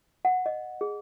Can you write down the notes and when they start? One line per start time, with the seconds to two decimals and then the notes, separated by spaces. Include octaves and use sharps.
0.25 F#5
0.46 D#5
0.81 G#4